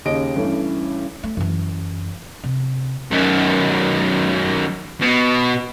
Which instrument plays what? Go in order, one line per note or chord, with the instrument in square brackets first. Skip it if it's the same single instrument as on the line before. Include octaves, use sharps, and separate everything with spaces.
[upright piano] D#2 C#3 G4 D#5 D7
G2 E3 A3 C#4
[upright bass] A3
F#2 E3
C3
[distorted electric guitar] F#2 D#3
B2